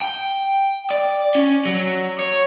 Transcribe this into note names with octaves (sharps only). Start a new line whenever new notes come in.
G5
D5
C#4
F#3
C#5